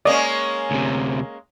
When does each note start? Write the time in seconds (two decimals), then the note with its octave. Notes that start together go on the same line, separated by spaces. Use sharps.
0.05 G#3 A#3 C#4 D5 D#5 D#6
0.71 D2 C3